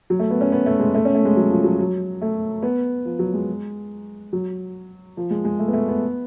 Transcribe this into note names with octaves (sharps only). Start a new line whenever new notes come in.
F#3
A3
B3
C#4
B3
A3
G#3
A3
C#4
A3
G#3
F#3
F3
F#3
F#3
A3
B3
F3
F#3
G#3
F#3
F3
G#3
G#3
A3
B3
A3
B3